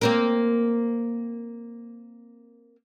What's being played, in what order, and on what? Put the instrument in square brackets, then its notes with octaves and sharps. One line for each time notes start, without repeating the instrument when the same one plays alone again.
[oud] A#3 C4 A#4